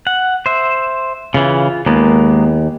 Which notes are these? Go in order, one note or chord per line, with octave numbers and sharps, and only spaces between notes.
F#5
C5 E5
C#3 E3 F4
D#2 G#3 A#3 B3